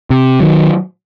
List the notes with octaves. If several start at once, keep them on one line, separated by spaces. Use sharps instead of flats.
C3
D#3 F#3